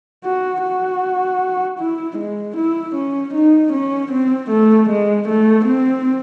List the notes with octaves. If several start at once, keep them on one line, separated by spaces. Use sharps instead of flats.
F#4
F#4
E4
G#3
E4
C#4
D#4
C#4
C4
A3
G#3
A3
C4